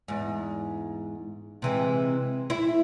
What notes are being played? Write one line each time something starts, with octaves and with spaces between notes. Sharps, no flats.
E2 G#2
C3 E3 G#3
E4